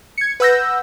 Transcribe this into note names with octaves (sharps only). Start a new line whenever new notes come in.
G#6 C#7
B4 F#5 E6 G6 A#6